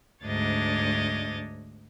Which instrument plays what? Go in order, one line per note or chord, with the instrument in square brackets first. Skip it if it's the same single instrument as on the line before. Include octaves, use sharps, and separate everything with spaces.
[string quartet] D2 G#2 D4 C#5 D#5 A6